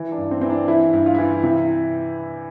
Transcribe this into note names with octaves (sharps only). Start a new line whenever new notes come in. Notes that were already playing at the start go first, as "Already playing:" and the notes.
Already playing: E3
D4
G2
C4
E3 C4
D4
E3 E4
G2
F4
E4
E3 F4
C3 E4